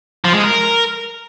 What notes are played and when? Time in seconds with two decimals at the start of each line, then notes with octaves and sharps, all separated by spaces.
0.25 F3
0.34 G#3
0.44 A#4